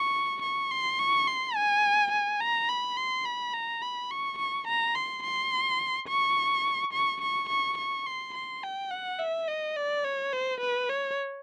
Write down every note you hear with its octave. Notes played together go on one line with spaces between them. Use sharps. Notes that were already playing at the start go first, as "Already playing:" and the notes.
Already playing: C#6
C#6
C6
C#6
C6
G#5
G#5
A#5
B5
C6
B5
A#5
B5
C#6
C#6
A#5
C6
C6
C#6
C#6
C#6
C#6
C#6
C6
C6
G5
F#5
E5
D#5
D5
C#5
C5
B4
C#5